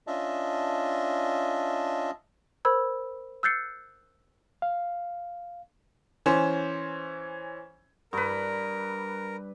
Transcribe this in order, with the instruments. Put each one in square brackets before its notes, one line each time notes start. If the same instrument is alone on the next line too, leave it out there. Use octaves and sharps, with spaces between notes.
[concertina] C#4 D4 F4 D#5 E5 A5
[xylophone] A#4 C5 B5 E6 G#6
E6 F#6 G6 A6 C7 C#7
[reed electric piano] F5
[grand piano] E3 C#4 C5
[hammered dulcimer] G2 B4 [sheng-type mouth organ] A#4